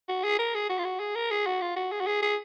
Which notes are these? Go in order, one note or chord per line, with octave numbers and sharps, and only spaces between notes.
F#4
G#4
A#4
G#4
F#4
F4
F#4
G#4
A#4
G#4
F#4
F4
F#4
G#4
F#4
G#4
G#4